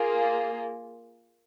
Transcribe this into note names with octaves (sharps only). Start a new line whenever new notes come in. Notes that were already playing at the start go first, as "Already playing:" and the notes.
Already playing: A#3 F4 G#4